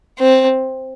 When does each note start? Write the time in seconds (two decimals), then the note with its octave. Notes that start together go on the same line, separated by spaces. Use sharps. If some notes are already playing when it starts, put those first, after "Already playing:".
0.19 C4